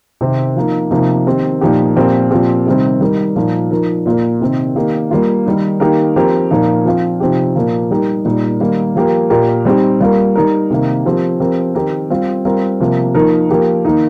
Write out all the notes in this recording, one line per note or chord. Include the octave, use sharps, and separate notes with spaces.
C3 D#3 C4
F3 A#3 D#4
C3 F3 A#3 D#4
D#3 C4 G4
A#2 F3 D#4 G4
A#2 F3 C4 G4 A#4
A#2 F3 C4 G4
C3 D#3 G3 C4
D#3 G3 D#4 A#4
A#2 F3 A#3 D#4
F3 D#4 A#4
A#2 A#3 F4 A#4
C3 D#3 C4
D#3 A#3 G4
G3 A#3 F4
D#3 G3 D#4
D#3 A#3 D#4 G4 A#4
F3 C4 G4 A#4
A#2 F3 A#3 D#4
F3 C4 F4
C3 F3 C4 D#4 G4
A#2 F3 A#3
G3 D#4 G4 A#4
A#2 G3 D#4
D#3 G3 A#3
F3 A#3 G4 A#4
A#2 A#3 G4 A#4
G3 C4 D#4 G4
G3 A#3 F4 A#4
G3 D#4 A#4
C3 D#3 A#3
F3 C4 G4 A#4
F3 C4 G4 A#4
D#3 C4 G4 A#4
G3 C4 F4
G3 C4 F4 A#4
C3 F3 A#3
F3 A#3 D#4 A#4
F3 A#3 G4 A#4
D#3 A#3 D#4